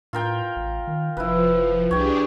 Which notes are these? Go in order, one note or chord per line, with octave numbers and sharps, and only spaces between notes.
A2 F4 A#4 G5
A1
D#3
F1 F3 E4 B4
C2 D4 G4 G#4 C#5 G5